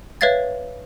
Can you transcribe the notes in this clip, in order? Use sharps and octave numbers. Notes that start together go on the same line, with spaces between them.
B4 C#5 E5 F5 G#6 A6